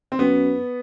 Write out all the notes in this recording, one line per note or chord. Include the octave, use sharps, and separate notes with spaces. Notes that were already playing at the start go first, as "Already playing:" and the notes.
C4
F#2 B3